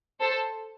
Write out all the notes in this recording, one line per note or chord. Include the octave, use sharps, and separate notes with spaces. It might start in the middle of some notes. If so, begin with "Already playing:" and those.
A4 C5